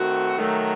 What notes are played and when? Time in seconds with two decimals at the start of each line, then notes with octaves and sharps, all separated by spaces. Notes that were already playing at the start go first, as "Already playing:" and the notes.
Already playing: D#3 A3 C4 F#4
0.36 D#3 F#3 A3